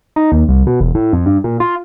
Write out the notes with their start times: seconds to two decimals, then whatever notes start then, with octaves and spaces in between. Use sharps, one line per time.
0.16 D#4
0.32 D#2
0.48 C2
0.67 B2
0.81 E1
0.95 A2
1.13 F2
1.26 G2
1.44 A#2
1.60 F4